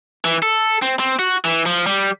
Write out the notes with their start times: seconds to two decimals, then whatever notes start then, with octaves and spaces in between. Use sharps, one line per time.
0.25 E3
0.42 A4
0.82 C4
0.99 C4
1.19 F#4
1.45 E3
1.66 F3
1.86 G3